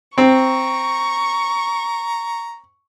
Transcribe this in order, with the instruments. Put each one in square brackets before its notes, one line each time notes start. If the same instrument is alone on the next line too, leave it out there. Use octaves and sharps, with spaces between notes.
[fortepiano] C4 [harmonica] A#5 [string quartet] C#6